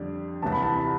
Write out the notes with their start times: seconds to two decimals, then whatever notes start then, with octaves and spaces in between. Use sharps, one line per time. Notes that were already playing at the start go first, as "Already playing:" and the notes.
Already playing: F2 D3 G3 D4
0.42 C2 C3 E3 A5
0.52 B5
0.63 A5